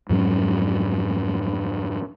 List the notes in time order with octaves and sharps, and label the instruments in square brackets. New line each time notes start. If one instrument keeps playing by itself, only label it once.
[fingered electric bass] F2 G#2 F#3 C#4